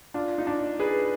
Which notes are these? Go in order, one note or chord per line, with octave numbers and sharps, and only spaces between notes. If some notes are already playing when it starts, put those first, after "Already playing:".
D4 F4
D#4
D4
G#4 B4